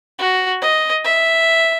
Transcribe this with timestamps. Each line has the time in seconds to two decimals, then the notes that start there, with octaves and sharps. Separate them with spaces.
0.19 F#4
0.62 D#5
1.04 E5